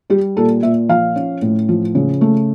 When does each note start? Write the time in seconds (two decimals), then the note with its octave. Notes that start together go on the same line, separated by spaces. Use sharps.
0.10 G3 G4
0.37 A#2 A4
0.63 A#2 E5
0.89 F3 F5
1.16 C#4
1.42 A2
1.69 F3
1.95 C#3
2.21 A3